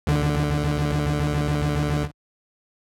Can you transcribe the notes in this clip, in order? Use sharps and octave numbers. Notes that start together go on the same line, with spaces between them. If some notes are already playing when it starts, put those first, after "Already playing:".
D2 D3